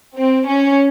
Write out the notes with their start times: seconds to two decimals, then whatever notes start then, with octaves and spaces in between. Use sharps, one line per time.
0.15 C4
0.46 C#4